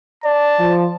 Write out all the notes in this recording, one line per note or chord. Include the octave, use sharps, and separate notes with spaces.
D5 A5
F3